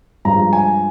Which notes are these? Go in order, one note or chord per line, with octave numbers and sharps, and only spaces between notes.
G2 F3 G#3 A#5
G#5